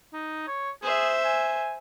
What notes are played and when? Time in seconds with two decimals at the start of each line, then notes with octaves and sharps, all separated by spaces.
0.13 D#4
0.48 C#5
0.83 G#4 C5 E5
1.25 G#5